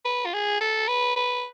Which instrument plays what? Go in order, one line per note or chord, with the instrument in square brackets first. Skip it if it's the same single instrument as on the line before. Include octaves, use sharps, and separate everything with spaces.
[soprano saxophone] B4
F4
G#4
A4
B4
B4